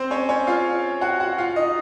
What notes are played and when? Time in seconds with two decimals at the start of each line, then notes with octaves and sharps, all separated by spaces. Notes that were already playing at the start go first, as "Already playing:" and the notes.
Already playing: C4 C5
0.11 C#4 C#5
0.29 C#4 C#5
0.47 F4 F5
1.01 F#4 F#5
1.20 F#4 F#5
1.38 F4 F5
1.56 D#4 D#5